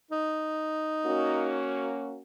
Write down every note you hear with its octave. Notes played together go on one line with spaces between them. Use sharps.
D#4
A#3 C#4 F#4